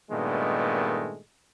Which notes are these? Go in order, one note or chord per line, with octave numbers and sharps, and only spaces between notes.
G2 A#2 D#3 G#3 A3 B3